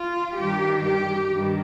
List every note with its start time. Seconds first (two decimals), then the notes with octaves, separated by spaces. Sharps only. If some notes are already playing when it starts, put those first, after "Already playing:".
Already playing: F4
0.37 G2 D#3 G4
0.83 G4
1.28 G2 D#3